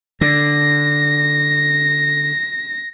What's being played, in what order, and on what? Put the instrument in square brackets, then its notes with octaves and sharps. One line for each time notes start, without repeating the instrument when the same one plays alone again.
[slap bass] D3 [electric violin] A#6